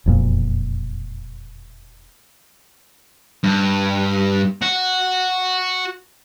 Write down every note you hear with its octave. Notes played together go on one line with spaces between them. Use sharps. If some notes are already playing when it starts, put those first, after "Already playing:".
E1 F2 A#2
G2
F#4